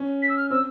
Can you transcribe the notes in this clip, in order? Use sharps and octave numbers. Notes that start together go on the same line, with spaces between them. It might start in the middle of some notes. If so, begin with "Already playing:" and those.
Already playing: C#4
B6
E6
F6
C4 E6